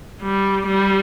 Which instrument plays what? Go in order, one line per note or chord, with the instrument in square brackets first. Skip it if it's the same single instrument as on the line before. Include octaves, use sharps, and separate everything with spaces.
[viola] G3
G3